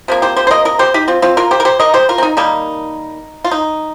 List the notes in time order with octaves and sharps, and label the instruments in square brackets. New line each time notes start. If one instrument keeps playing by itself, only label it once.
[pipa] C3 F3 A#3
G4 C5
G4 C5
C5
A#4 D#5
A#4 D#5
G4 C5
D#4 G4
C4 F4
C4 F4
F4 A#4
G4 C5
A#4
G4 C5
A#4 D#5
G4 C5
F4 A#4
C4
D#4
D#3 G3 A#3 D#4
F4
D#4